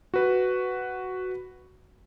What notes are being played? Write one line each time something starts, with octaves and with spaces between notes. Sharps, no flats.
F#4 B4